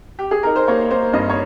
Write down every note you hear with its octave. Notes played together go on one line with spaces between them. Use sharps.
G4
G#4
D#4 A#4
C5
A#3 C#5
A#3 C5
G2 D#5
C#5